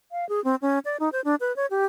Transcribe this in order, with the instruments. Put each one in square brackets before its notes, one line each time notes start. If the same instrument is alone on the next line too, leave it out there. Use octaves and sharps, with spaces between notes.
[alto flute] F5
G#4
C4
C#4
D5
D#4
C5
D4
B4
C#5
G4